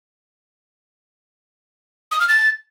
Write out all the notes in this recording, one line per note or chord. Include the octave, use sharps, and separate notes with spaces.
D#6
F6
A6